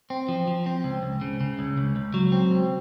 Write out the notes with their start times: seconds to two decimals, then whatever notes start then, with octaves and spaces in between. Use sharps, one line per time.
0.10 C4
0.28 F3
0.47 F3
0.66 C4
0.84 C#2
1.03 C#2
1.21 C#3
1.41 C#3
1.59 C#2
1.78 C#2
1.96 C#2
2.14 F#3
2.32 C4
2.51 C#2